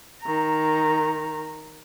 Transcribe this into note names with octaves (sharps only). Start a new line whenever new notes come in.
D#3 A#5